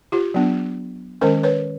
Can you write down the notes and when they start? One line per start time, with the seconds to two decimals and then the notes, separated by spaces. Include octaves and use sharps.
0.12 F4 G4
0.34 F#3 B3 D4
1.21 D#3 G#3 C#4 A#4 C5
1.43 B4 C#5